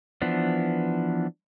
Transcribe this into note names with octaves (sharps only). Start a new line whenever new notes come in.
E3 F3 B3 D4